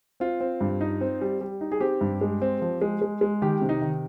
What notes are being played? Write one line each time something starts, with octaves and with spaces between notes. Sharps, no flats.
C4 F4
C4
G2
D#4
C4
G3
G3
D#4
G#4
C4 G4
G2
G#3
C4
F3
G#3
G#3
G#3
D#3 G4
C3
D#4
D#3